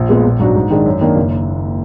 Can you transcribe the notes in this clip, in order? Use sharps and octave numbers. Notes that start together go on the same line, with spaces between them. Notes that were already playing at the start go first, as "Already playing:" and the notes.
Already playing: A#1
A#2 G#3 B3
A#1
G#2 F#3 D4 F#4
G#2
D#3 G#3 D4
F#2
D#3 A#3 D4
F#1